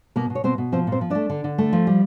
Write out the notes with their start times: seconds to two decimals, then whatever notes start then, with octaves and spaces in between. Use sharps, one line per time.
0.16 B2 A#3 A#4
0.30 B2
0.35 C#5
0.44 B2 C4 C5
0.58 B2
0.72 F3 C4 C5
0.87 A#2
0.92 C4 C5
1.01 F3
1.10 A3 D4 D5
1.29 D3
1.44 D3
1.58 A3
1.73 F3
1.87 G3